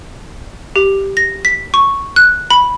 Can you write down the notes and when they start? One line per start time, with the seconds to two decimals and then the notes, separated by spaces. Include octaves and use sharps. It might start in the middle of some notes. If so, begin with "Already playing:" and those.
0.76 G4
1.17 A#6
1.45 B6
1.74 C#6
2.16 F#6
2.50 B5